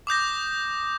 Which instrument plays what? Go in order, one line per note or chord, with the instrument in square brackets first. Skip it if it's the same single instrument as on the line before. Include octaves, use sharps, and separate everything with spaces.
[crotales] D6 D#6 G6 A#6